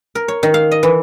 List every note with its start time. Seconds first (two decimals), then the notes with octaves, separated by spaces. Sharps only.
0.15 A#4
0.28 C#5
0.43 D#3
0.54 F5
0.71 D#5
0.83 E3